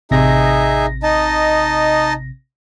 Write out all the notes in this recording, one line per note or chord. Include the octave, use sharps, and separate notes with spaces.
A1 C3 D#4 G#4 E5 A#6
D#4 D#5 A5